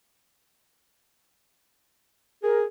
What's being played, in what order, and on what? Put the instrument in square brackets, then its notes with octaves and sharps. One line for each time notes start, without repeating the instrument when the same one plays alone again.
[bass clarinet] G#4 [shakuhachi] A#4